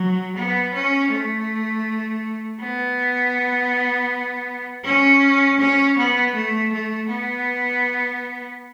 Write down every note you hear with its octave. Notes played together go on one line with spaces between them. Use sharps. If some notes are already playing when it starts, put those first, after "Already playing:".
Already playing: F#3
B3
C#4
A3
B3
C#4
C#4
B3
A3
A3
B3